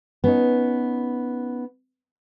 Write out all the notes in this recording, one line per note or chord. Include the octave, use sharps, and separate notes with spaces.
B3 C#4 D#4